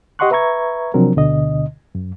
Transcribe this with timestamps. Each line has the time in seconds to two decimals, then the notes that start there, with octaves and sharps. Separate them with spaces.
0.19 G4 D#5 F#5 C6 C#6 F#6
0.31 B4 E5 A#5 C#6 G#6
0.94 C3 F3 F#3 C4 D4 A#4
1.15 D2 B2 D3 D#5
1.95 F#2